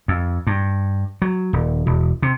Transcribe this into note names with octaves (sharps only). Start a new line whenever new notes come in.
F2
G2
F#3
D#1
E1
C3